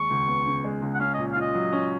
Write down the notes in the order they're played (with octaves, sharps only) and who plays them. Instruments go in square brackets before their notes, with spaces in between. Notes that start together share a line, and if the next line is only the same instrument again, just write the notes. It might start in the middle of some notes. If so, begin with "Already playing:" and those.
Already playing: [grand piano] D#2 G#3 [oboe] C#6
[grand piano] C#2
B3
C#3
G#3
C#2
[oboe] F#5
[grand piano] C#4 [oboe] F5
[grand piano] A#2 [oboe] D#5
[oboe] F5
[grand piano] F4 [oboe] D#5
[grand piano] F#3
C#4